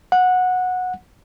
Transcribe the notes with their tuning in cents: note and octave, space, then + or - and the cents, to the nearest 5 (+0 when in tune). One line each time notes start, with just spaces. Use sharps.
F#5 -15